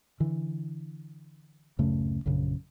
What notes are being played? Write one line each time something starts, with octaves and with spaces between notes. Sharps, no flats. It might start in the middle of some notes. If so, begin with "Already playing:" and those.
D3 E3
D1 F#2 C#3 A3
A#1 F#2 C#3